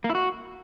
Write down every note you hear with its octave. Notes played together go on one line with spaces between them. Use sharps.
A#3
E4
F#4